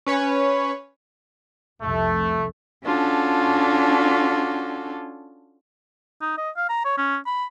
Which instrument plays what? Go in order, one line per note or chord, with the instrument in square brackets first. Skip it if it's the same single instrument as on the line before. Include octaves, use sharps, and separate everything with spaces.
[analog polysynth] C#4 B4 C#5
[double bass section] F1 C2 [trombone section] A3
[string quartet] C#4 D4 F4 F#4 A4
[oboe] D#4
D#5
F5
A#5
C#5
C#4
B5